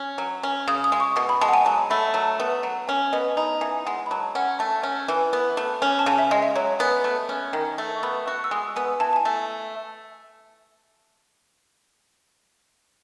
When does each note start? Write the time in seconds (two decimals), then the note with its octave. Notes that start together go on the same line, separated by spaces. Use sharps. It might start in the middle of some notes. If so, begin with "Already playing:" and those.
Already playing: C#4
0.18 F#3
0.43 C#4
0.68 C#3 D#6
0.84 D#6
0.92 G#3
1.00 C#6
1.16 B2 D#6
1.29 B5
1.41 G#3 A5
1.49 F#5
1.54 G#5
1.65 F#3 A5
1.90 A3 B5
2.14 F#3 A5
2.40 B3
2.63 F#3 F#5
2.88 C#4 G#5
3.12 B3 D#5
3.24 G#5
3.31 A5
3.37 D#4 B5
3.50 A5
3.61 E3 G#5
3.85 G#3 F#5
4.06 B5
4.11 F#3 A5
4.35 C#4 F#5
4.59 A3 A5
4.83 C#4
5.08 E3
5.33 B3
5.57 A3
5.82 C#4
5.99 A5
6.06 C#3 G#5
6.18 E5
6.31 G#3 D#5
6.43 E5
6.55 F#3 C#5
6.79 B3 G#5
7.04 A3
7.29 C#4
7.53 D#3
7.78 A3
7.96 C#6
8.03 B3 B5
8.26 F#4 C#6
8.44 E6
8.51 G#3 D#6
8.76 B3 G#5
9.00 E3 A5
9.13 A5
9.16 G#5
9.25 A3